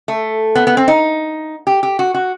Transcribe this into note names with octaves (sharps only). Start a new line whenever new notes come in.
A3
B3
B3
C4
D#4
G4
G4
F#4
F#4